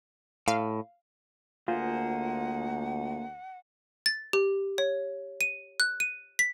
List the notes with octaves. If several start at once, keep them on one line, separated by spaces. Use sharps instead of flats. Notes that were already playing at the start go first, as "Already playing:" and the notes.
A2 F5
D2 A#3 F4 G#4 C5 F#5
A6
G4
C#5
D#7
F#6
D#7
B6